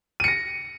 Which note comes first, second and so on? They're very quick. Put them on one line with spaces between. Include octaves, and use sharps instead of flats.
D#7 C#7 A#6